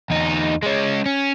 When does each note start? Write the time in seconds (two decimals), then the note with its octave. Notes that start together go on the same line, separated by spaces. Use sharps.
0.10 E2 D#4
0.63 G#3 C#4
1.06 C#4